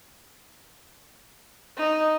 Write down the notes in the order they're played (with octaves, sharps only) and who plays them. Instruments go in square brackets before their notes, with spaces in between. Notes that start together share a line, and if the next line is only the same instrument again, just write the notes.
[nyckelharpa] D#4